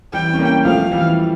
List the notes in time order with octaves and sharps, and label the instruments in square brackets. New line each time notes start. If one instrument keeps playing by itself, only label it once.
[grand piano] E3 G3 [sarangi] G5
[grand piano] C#4
G3 A#3
[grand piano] F3 A3 [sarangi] F5
[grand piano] E3 G3